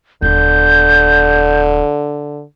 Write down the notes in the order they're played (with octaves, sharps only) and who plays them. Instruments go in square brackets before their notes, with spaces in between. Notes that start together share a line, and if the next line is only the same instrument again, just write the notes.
[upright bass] D#1 B3 [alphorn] D3 [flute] G6